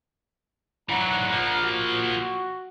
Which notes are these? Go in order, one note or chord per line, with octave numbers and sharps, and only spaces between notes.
E3 F#3 D4 F#5 A#5
F3 A#3
F#4